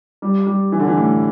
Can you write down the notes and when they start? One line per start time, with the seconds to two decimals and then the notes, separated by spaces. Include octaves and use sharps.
0.22 G3
0.47 G3
0.72 E3
0.80 D3
0.88 E3
0.97 A2